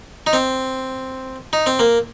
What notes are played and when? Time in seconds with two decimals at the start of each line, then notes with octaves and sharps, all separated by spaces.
0.27 D#4
0.33 C4
1.53 D#4
1.66 C4
1.79 A#3